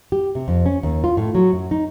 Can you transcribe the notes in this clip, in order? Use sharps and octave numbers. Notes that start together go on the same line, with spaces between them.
G4
C3
F2
C#4
D#2
F4
A2
F#3
F#2
D#4